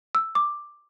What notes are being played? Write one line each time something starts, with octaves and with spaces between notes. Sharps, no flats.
E6
D6